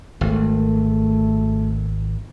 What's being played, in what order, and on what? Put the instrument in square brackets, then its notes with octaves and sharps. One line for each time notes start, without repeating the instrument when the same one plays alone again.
[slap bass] G#1 [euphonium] A3